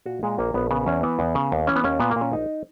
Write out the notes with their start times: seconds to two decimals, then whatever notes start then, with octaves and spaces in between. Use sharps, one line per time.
0.06 A#2 F#4
0.23 A#2 G#3
0.39 A#1 A#3
0.54 A#1 B3
0.71 C#3 B3
0.86 E2 C#4
1.03 E3 B3
1.19 E2
1.35 C#3
1.52 D#2
1.67 E3 C#4
1.76 B3
1.84 D#2 C#4
2.00 A#2 B3
2.11 A#3
2.16 A#2
2.22 C#4
2.32 A#1 D#4